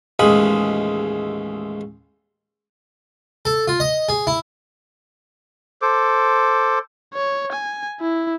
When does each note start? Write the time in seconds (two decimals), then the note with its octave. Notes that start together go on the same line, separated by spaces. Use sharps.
0.19 A1 D#2 G#3 B5 D#6
3.45 A4
3.68 F4
3.80 D#5
4.09 G#4
4.27 E4
5.82 A4 C5 D6
7.14 C#5
7.52 G#5
8.01 E4